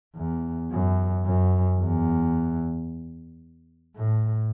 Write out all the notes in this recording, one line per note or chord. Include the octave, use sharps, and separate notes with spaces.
E2
F#2
F#2
E2
A2